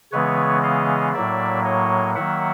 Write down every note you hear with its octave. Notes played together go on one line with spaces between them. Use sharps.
C#3 E3 G#3 B3 B4 C#5
D#5 F5
A2 F#3 A#3 D5 E5
C#5 D#5
D#3 F#3 A#3 E5 F#5